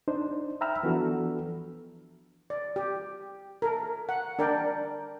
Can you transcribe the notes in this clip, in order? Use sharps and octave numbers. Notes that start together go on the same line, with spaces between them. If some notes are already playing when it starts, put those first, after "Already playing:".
D4 D#4 C5
E5 G5 A#5 B5 E6 F6
E3 F3 B3 D4 F#4 A4
D5
G4
A4 A#4
F#5
D4 A#4 D5 G5